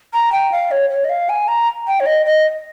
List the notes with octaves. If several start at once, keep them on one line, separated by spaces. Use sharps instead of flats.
A#5
G5
F5
C#5
C#5
D#5
F5
G#5
A#5
G5
C#5
D#5
D#5